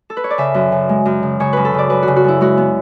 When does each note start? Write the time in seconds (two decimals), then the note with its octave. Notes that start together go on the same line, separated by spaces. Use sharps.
0.10 A4
0.17 B4
0.24 C#5
0.30 D5
0.38 C#3 E5
0.54 F#2
0.72 C#3
0.89 G#3
1.05 F#2
1.23 C#3
1.40 C#3 C#5
1.53 F#2 B4
1.65 A4
1.74 C#3 D5
1.90 F#2 B4
2.02 F#4
2.08 C#3
2.16 F#4
2.24 F#2 E4
2.41 G#3 F#4
2.57 B3